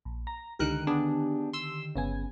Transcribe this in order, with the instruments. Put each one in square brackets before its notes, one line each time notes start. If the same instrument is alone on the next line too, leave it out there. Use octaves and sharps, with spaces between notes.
[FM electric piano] A#1
A#5
[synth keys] C#2 A#4 F#6 [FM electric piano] D3 D#3 G4
[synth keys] B3 D4 G#4
C6 E6
[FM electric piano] G1 B3 G#5 [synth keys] C#3